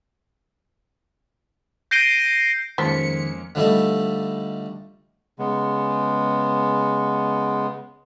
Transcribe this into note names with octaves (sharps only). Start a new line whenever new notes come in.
G6 A#6 C7 D7 D#7 G7
F2 D#3 F3 G#3 A#3 C#4 B6 C#7
D3 F3 G3 A3 D#4
C#3 G#3 B3